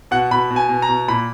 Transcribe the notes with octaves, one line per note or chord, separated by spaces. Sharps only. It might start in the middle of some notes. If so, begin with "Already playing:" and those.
B2 F#5
B2 B5
B2
G#5
B2
A#5
B2
A#2 B5